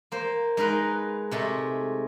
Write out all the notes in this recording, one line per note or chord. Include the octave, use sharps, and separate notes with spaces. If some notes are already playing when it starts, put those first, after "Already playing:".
A#3 C5
G#3 D#4 A#4 B4
C3 G#3 A3